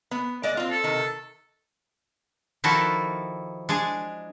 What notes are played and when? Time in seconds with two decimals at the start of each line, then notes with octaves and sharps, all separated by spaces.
0.11 B3
0.43 G#3 D5 D#5
0.57 C4 F4
0.71 A4
0.84 C3 D#3
2.64 D#3 F3 E4 F#4 A4
3.69 G#3 D4 G#4